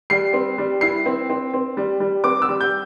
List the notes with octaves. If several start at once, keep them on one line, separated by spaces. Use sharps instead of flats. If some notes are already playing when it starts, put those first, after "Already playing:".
G3 C7
C4
G3
E4 C7
C4
C4
C4
G3
G3
C4 D6
E6
G3
G6